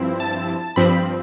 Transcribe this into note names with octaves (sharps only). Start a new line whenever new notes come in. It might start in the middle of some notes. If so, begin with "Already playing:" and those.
Already playing: G2 F3 C4 E4
A5
G2 F3 C4 B5